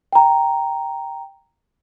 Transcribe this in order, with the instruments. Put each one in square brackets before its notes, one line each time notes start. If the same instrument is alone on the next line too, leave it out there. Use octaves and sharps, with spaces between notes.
[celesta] G5 A#5